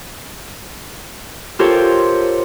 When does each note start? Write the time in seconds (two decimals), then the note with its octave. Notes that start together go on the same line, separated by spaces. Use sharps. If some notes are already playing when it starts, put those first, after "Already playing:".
1.59 F4 G4 A4 A#4 C5 C#5